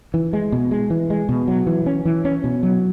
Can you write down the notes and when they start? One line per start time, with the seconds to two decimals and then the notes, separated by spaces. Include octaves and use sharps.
0.14 E3
0.33 G#3
0.52 B2
0.71 G#3
0.90 E3
1.10 G#3
1.29 B2
1.48 F#3
1.67 E3
1.86 C#4
2.05 E3
2.25 C#4
2.44 B2
2.63 F#3